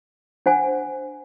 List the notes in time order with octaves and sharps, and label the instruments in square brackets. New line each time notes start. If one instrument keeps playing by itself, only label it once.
[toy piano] D4 C5 F#5 G#5